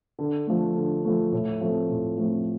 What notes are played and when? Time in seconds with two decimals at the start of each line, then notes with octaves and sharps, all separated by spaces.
0.19 D3
0.47 F3 A3
0.76 D3
1.05 F3 A3
1.32 A2
1.61 F3 A3 C4 F4
1.89 A2
2.18 F3 A3 C4 F4